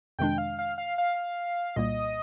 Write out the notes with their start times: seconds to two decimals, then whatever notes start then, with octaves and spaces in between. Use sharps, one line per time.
0.19 F2 C3 D#3 G#3 D4 G5
0.38 F5
0.59 F5
0.78 F5
0.98 F5
1.76 C2 A#2 G3 A#3 D#5